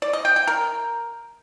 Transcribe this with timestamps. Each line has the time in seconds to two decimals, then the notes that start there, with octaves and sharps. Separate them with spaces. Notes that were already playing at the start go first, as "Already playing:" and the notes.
0.02 D5
0.13 D#5
0.25 G5
0.36 G5
0.47 A#4